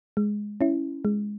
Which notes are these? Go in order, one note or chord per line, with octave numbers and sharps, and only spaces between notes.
G#3
C#4 E4
G#3